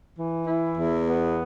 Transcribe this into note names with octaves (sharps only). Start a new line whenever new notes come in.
E3
E4
E2
B3